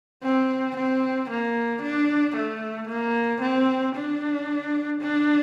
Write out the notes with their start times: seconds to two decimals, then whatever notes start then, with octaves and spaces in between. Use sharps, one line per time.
0.24 C4
0.77 C4
1.30 A#3
1.82 D4
2.36 A3
2.88 A#3
3.41 C4
3.95 D4
5.01 D4